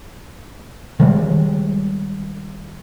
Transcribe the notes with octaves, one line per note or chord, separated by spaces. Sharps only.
D#3 G3 G#3